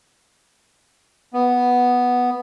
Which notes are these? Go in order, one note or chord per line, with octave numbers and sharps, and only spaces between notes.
B3